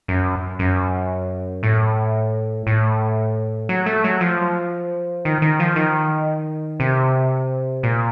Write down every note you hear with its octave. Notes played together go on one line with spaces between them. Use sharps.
F#2
F#2
A2
A2
F#3
A3
F#3
F3
D#3
D#3
F3
D#3
C3
A#2